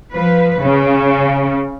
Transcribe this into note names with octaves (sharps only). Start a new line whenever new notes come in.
F3 B4
C#3